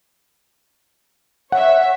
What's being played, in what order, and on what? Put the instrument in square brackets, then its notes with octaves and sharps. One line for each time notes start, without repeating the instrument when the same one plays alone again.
[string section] C#5 E5 [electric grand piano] F#5